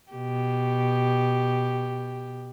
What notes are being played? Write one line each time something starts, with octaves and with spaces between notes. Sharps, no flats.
B2 G4